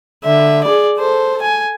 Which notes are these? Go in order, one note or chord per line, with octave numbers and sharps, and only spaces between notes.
D3 E5
G#4 D5
A4 C5
G#5